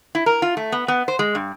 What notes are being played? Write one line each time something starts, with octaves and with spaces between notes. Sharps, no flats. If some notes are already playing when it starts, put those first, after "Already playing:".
E4
A#4
F4
A3
B3
B3
C5
G#3
G2